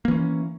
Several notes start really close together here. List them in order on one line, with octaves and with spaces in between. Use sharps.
A#3 E3 C#4